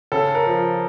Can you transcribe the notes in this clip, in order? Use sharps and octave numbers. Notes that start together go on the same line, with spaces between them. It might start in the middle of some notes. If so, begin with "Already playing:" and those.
C#3 A4
A#4
F3